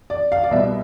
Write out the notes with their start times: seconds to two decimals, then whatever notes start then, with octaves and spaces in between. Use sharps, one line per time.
0.10 D5
0.32 F5
0.44 D5
0.51 C2 B2 E5